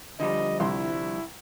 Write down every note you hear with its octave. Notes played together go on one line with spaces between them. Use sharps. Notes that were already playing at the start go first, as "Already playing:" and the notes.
D3 F3 G3 D#5
C2 E4 C6